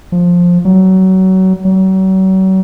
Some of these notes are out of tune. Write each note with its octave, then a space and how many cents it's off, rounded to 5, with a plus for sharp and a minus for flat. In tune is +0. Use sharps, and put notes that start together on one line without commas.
F3 +10
F#3 +25
F#3 +40